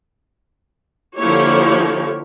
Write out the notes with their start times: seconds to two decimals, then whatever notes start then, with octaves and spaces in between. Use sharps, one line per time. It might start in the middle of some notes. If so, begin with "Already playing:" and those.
1.18 D3 F3 A#3 E4 G4 C#5